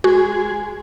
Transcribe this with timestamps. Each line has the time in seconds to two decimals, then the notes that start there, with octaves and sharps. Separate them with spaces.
0.04 G#3 F#4 G#4